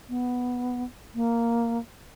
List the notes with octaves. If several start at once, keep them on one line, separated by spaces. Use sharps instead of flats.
B3
A#3